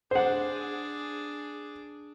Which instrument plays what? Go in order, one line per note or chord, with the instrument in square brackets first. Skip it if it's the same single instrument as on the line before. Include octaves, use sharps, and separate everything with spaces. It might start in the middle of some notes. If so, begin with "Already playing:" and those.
[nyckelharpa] D4 G#4 [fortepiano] C5 F#5